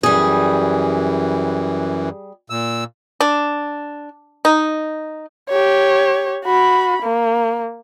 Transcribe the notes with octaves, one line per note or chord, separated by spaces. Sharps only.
F#2 E3 G3 G#4
A#2 E6
D4
D#4
G4 C#5
F#4 B5
A#3